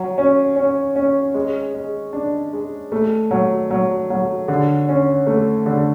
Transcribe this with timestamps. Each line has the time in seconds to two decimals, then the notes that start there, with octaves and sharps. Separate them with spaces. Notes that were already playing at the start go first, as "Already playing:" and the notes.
Already playing: F#3
0.18 C#4
0.56 C#4
0.96 C#4
1.34 G#3
1.74 G#3
2.13 D4
2.53 G#3
2.92 A3
3.31 F#3
3.71 F#3
4.10 F#3
4.48 D3
4.89 C#4
5.27 A3
5.66 D3